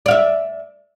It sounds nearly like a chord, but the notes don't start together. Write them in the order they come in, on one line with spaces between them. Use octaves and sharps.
D5 F5 E5